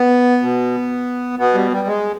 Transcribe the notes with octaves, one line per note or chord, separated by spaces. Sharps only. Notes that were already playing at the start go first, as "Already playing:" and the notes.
Already playing: B3
B2
B2 B3
G3
G3
G#3